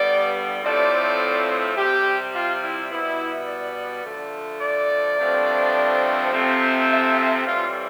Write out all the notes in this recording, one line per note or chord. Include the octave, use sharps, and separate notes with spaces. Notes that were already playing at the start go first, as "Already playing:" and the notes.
Already playing: G2 D3 G3 B3 D5
A2 F3 A3 C4 D5
C3 G3 C4 G4
F4
E4
B2 G3 B3 E4
D5
D3 F3 A3
D5
G2 D3 F3 A3 C4
C3 F3 A3 C4
E5
E5
A2 E3 G3 C4 F4